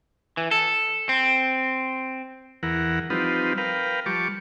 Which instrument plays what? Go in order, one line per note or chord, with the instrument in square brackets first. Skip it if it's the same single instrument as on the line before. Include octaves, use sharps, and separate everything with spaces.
[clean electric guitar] E3
A4
C4
[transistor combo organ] E2 E3 A#4 F#5
F3 G3 C4 D#4 F4 B4
A#4 B4 F5 G5
F3 G3 A5 C#6 D6